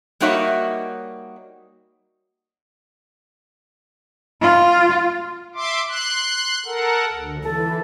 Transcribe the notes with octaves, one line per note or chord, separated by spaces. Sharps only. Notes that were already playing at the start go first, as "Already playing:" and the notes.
G3 A#3 D#4 F#4 C#5 E5
F4
E5 C6 D6
C6 F#6
A4 A#4 F#5
D2
E3 A4